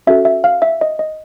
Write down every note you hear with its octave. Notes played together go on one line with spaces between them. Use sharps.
C#4 F#4 A4 E5
E5
F5
E5
D#5
D#5